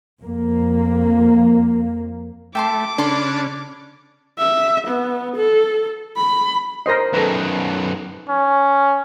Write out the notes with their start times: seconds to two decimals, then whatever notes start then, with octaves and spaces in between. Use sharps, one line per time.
0.21 F2 A#3
2.55 A3 E5 G5 A5 C6 D6
2.98 C#3 C#4 D4 A4 B5 C6
4.38 E5
4.88 B3
5.37 A4
6.17 B5
6.86 A#4 C5 D#5 A#6 C7
7.13 F#2 D#3 A4 B4
8.29 C#4